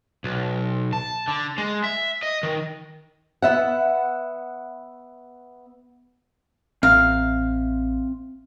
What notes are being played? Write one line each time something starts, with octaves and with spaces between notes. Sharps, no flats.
B1
A5
D3
G#3
E5
D#5
D#3
B3 E5 F#5
A1 C4 E5 F5 A#5